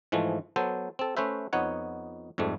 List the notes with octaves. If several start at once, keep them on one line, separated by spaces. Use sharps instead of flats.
G#2 E3 F3 G#3 A3
F#3 B3 A4 C5
C4 A4
A3 C#4 B4 C5 E5
F2 B3 D#4 C#5 F#5
F2 G#2 G3 A3